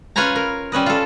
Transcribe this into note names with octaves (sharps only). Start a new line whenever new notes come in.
C#4 F4 B4 C#5 G#5 A#5
A#4
G3 C#4 B4 D#5
F4 A4